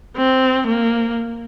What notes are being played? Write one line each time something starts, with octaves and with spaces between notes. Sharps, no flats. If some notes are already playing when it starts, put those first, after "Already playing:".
C4
A#3